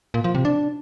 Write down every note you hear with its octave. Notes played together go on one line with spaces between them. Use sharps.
A#2
F3
C3
D4